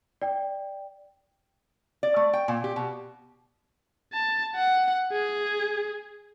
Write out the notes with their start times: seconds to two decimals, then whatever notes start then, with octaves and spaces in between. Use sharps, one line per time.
0.22 D5 G5
2.03 D5
2.16 A3
2.33 G5
2.48 A#2
2.64 G4
2.76 B2
4.13 A5
4.55 F#5
5.12 G#4